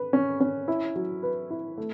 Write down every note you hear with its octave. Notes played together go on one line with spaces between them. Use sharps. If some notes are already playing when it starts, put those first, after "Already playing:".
Already playing: B4
C#4
C#4
E4
F#3
B4
E4
A3